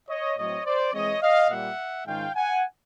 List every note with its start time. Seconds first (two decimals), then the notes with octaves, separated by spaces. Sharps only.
0.09 C#5 D#5
0.37 A2 F#3 A3 C4 C#5 D#5
0.65 C5 D5
0.93 E3 G#3 C4 C#5 D#5
1.22 D#5 F5
1.50 A#2 G3 A#3 E5 F#5
2.06 G#2 D#3 G#3 C#4 F4 F5 G5
2.35 F#5 G#5